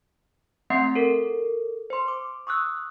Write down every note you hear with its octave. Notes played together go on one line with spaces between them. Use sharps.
A3 C4 E5 F#5 C6 C7
A4 A#4
C5 C6
D6
C#6 D#6 E6 F#6